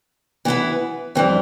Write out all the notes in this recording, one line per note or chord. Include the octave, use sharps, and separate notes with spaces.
E3 B3 E4 B4
F2 E3 G3